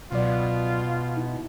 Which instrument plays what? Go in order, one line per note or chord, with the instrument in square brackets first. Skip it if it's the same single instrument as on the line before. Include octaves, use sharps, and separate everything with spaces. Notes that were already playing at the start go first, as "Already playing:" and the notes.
[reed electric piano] C#2 F#3 D5 [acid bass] B2 [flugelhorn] F4
[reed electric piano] D#4 E4